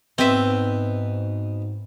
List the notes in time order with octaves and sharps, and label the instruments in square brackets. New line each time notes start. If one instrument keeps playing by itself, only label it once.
[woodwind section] G#2 [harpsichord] B2 B4 [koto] C4 E5